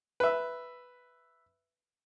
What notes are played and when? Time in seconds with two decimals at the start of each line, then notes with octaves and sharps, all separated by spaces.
0.20 B4 E5